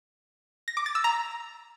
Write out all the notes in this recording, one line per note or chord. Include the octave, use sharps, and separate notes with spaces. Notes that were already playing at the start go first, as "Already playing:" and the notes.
A#6
D6
A6
E6
A#5